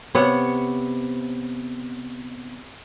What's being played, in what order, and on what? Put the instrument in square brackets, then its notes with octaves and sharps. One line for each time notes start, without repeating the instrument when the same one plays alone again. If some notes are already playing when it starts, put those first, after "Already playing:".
[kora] C3 B3 C#5 F#5